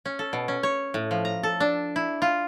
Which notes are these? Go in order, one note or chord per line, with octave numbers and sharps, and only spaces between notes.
C#4
A4
B2
C#4
C#5
A2
F3
A#5
A4
D4
E4
F4